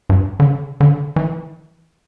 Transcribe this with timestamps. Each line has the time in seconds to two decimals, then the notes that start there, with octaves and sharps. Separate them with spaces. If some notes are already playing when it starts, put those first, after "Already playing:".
0.09 G2
0.40 D3
0.45 C#3
0.80 D3
1.16 E3